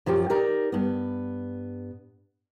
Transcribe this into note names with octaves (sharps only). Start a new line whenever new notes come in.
F#2 F3 F#3 G4
D#4 G4 A#4 D5
G2 B3